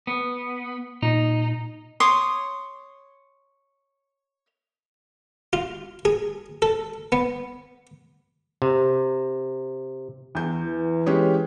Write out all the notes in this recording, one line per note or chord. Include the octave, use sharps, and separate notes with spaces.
B3
A#2 D#4
C#5 C6 D6 D#6
F4
G#4
A4
B3
C3
E2 G6
E3
G#3 C#4 G4